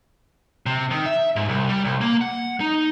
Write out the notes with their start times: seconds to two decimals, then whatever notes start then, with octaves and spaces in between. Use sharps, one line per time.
0.66 C3
0.91 D#3
1.06 E5
1.36 G#2
1.49 C2
1.69 G3
1.84 C2
2.01 A#3
2.21 F#5
2.60 D#4